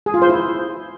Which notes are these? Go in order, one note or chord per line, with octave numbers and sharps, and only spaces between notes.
G#4
F4
C5
E4